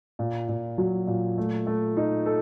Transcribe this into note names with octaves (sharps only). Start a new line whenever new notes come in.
A#2
A#2
F#3
A#2
A3
A3
D#4
A4